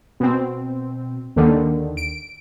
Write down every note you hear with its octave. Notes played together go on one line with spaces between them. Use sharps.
B2 C4
D#2 D3 D#3
D7